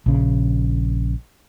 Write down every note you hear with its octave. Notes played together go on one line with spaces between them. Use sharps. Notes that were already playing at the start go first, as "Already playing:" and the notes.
A#1 C#3